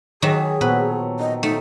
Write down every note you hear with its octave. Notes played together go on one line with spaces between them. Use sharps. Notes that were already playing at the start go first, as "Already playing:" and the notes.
D#3 F#3 G4 G#4 C#5 E5 G#5
A#2 F#3 B3 A4 B4 C5
D#3 D#5
A3 D#4